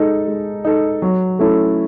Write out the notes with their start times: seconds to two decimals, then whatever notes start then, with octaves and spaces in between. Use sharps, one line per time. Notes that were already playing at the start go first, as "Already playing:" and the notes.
Already playing: G#3 D#4 A4
0.27 G#3
0.65 D#4 A4
1.02 F#3
1.39 A3 C#4 E4 A4